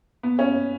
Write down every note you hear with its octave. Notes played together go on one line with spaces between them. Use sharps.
B3
C#4